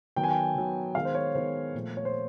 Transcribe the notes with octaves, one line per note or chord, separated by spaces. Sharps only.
D#3 F#3 B3 G5
G#5
G5
D#3 F#3 B3
D#3 G#3 B3 F5
C5
C#5
D#3 G#3 B3 C5
A#2 F3 A3
C#5
C5